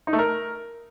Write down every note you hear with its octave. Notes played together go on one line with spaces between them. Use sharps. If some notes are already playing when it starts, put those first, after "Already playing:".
D#4
A3
A#4